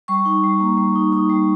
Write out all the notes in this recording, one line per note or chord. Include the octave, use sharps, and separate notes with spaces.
G3 C#6
D#4
G3
A#3
G3
D#4
D#4
G3